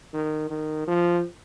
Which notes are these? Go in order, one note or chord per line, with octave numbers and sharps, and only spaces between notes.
D#3
D#3
F3